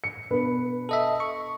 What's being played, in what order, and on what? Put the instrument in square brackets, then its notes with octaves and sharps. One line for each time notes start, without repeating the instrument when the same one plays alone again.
[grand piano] C#7
B2 D4 B4
[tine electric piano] A4 D#5 E5
C#6